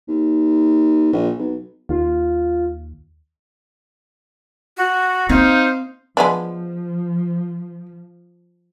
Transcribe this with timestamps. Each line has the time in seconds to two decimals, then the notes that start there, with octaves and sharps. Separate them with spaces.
0.08 D#2
1.13 A#1
1.39 B1
1.89 D#2 F4
4.77 F#4
5.29 C4 D#4 C5 F5
6.17 F3 G#3 B3 D4